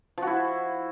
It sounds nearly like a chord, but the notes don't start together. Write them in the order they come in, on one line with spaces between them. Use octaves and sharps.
F3 F#4 E4